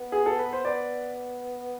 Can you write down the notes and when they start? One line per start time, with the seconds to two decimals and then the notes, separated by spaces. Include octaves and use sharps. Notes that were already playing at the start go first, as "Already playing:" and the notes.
Already playing: B3
0.12 G#4
0.26 A4
0.39 B4
0.53 C5
0.65 B3 B4 D5